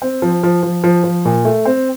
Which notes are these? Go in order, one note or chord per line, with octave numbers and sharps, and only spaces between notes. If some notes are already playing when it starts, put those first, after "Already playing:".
C4
F3
F3
F3
F3
F3
A#2
A3
C4